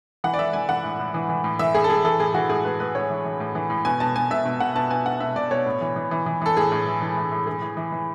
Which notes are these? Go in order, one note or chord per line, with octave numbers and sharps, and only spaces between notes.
E3 F#5
D5
E3 E5
E3 G#5
E3 F#5
A2
A2
E3
E3
A2
E3 E5
A2 G#4
A4
A2 G#4
E3 A4
A2 G#4
E3 F#4
A2 G#4
A2 B4
A2 B4
A2 C#5
E3
E3
A2
E3
A2
B2 G#5
B2 A5
B2 G#5
B2 E5
B2
B2 F#5
B2 A5
B2 G#5
B2 F#5
B2 E5
B2 D5
B2 C#5
A2
E3
E3
E3
E3
E3 A4
A2 G#4
A2
E3
E3
A2
A2
E3 G#4
E3
E3
E3